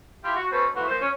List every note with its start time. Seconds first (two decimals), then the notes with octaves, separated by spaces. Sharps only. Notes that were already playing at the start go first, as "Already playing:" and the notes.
0.23 E4 F4 G4
0.36 F#4
0.52 B2 C#4 A4 B4 C5
0.75 E3 F3 A3 B3 F#4
0.87 A#2 F3 C5
1.01 C#4